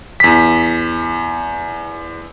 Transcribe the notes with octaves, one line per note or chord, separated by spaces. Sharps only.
E2 B6